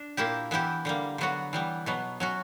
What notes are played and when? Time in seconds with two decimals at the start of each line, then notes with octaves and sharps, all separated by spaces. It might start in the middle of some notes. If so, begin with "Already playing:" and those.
Already playing: D4
0.17 A#2 A#3 E4 G4
0.51 E3 B3 E4 G4
0.85 D3 G3 A#3
1.18 D3 F#3 B3 F#4
1.53 E3 G3 B3
1.86 B2 F#3 B3
2.20 F#3 C#4 F#4